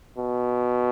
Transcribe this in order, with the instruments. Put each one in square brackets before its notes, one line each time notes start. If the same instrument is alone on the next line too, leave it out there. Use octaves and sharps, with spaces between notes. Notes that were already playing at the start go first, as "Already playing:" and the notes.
[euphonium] B2